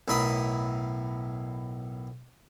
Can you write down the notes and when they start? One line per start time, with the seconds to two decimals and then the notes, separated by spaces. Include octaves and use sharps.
0.08 B1 A2 A#4 B5 D#6